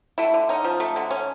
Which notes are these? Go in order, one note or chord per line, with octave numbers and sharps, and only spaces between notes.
A3 E4
D3
C#4 D#4
F3
A3
D3
C#4